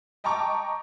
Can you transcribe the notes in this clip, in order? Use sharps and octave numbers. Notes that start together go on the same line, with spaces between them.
D#5 G5 A5 A#5 C#6 D6